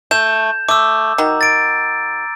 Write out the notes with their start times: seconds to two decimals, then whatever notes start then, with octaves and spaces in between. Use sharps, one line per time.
0.11 A3 G6 E7
0.69 A3 D6 E6
1.18 D#3 F#4 A#5
1.41 A6 D7